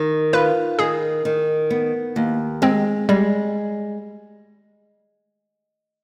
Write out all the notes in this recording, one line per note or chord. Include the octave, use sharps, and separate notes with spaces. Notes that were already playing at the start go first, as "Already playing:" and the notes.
Already playing: D#3
F4 B4
D#3 G#4
D#3
B3
D#2
G#3 C4
G3 G#3